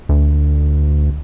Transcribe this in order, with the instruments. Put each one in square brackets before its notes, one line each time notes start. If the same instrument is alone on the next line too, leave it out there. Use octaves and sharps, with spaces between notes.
[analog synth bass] D2